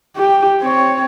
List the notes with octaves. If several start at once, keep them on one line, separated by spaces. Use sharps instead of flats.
G4
C4 C#5